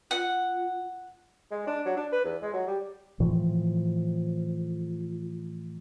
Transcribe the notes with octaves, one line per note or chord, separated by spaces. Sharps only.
F4 F#5
G#3
D4
F#3
D4
B4
E2
G#3
F#3
G3
A2 E3 F3